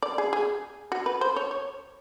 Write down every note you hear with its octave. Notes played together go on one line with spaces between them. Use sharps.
D5
G#4
G#4
F#4
B4
C5
C#5
C#5